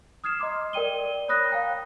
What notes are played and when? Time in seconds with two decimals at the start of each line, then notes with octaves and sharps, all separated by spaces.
0.24 D#6 F6 G#6 C7 E7
0.40 D#5 A#5 C6 D6
0.73 A#4 D5 G5 D#7 G7
1.28 C#5 B5 D#6 F#6 A#6
1.50 F5 G5 A#5